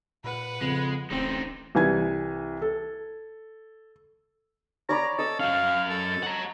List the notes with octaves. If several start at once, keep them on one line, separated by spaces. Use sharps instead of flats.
A#2 B4 F#5
F2 C#3 G#3
D1 A1 D3 C4 D#4
C2 E3 G#5 G#6
A4
C#5 D5 A#5 B5
A4 D#5
C#4 F#4 F5
A4
F#5 A#5